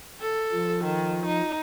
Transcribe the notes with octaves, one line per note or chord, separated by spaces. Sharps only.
A4
F3
D#3
D#4